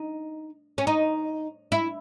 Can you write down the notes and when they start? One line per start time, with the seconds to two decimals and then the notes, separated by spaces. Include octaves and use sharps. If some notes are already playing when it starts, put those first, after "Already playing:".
Already playing: D#4
0.78 C#4
0.87 D#4
1.72 E4